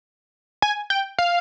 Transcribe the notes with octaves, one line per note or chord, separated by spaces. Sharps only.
G#5
G5
F5